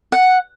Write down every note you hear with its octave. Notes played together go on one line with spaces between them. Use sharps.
F#5